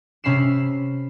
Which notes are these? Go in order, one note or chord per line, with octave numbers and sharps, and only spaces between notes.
C3 C#4 B5 C7 E7